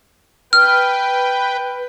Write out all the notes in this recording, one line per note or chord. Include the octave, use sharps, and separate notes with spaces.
B4 G5 F6